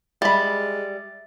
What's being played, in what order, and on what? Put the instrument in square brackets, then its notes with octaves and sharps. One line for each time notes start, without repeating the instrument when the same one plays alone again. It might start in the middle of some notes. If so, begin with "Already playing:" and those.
[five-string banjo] G3 B5 [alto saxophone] G#3 [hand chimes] E5 A6